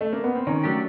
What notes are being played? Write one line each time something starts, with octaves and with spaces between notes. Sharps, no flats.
A3
A#3
B3
C4
D#3 C#4
F#3 A3 D4 G4